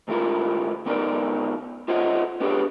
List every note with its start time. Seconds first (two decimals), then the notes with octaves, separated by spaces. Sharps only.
0.08 D2 G#2 E4 F4 A#4
0.86 D3 B3 D#4 A#4 D5
1.88 F4 C5 C#5 D#5 E5 F#5
2.40 B3 D4 G4 G#4 C#5